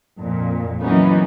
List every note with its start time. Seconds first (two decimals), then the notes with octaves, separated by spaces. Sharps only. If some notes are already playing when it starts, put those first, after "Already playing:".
0.18 F2 A#2
0.80 E3 F#3 A#3 B3 C#4 D#4